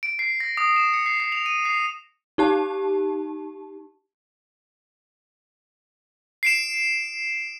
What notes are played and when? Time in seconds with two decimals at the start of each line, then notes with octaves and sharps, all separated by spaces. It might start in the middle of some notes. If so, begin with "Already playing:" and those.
0.03 D7
0.19 C7
0.40 A#6
0.57 D#6
0.76 E7
0.93 C#7
1.06 C7
1.20 C7
1.32 F7
1.46 D#7
1.65 C7
2.38 D#4 G4 A5
6.43 C7 D7 E7